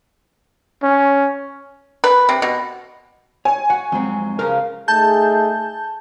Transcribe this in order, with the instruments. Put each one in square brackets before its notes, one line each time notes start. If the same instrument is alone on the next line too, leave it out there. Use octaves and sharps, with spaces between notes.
[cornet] C#4
[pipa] B4
C3
B2
[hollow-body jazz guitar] C#5 [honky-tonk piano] G#5
[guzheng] F#4 [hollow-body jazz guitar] F#5
[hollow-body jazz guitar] F2 G#2 C4 [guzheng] F#3
[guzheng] C#3 F3 F5 [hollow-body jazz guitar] A#4 A#5
[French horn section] A3 D#4 G#4 [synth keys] A5 G6